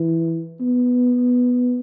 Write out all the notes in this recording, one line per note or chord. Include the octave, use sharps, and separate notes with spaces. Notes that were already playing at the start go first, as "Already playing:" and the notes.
Already playing: E3
B3